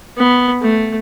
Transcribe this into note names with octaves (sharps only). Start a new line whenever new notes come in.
B3
A3